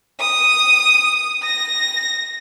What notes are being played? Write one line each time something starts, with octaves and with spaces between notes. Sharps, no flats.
D#6
A#6